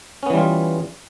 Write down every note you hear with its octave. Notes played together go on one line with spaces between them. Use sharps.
E3 G3 B3 C#4 F4